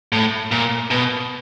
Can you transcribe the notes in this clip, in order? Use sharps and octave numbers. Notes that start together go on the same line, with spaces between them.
A2
A#2
B2